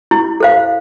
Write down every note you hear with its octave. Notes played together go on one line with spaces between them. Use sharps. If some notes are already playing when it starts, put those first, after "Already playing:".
E4
A4 C5 F5